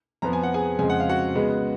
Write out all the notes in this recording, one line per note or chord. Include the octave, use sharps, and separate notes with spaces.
F2 F3 B3 A#5
G#5
F#5
G#4 G#5
F2 C#3 F3 G#3 G#5
F#5
F5
F#4 F#5
C#3 G#3 B3